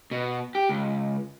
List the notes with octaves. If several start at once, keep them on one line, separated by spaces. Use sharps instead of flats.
B2
G4
C#2